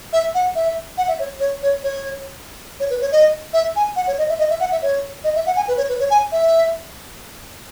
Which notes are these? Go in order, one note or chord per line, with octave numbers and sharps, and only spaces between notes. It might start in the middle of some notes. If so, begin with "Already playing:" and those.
E5
F#5
E5
F#5
E5
C#5
C#5
C#5
C#5
C#5
B4
C#5
D#5
E5
G#5
F#5
C#5
D#5
E5
D#5
E5
F#5
E5
C#5
D#5
E5
F#5
G#5
B4
C#5
B4
C#5
G#5
E5